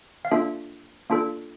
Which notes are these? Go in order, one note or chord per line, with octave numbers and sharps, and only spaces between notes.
F5
A#3 D4 F4 A4 E5
A#3 D4 F4 A4